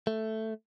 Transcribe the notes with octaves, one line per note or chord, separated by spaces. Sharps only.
A3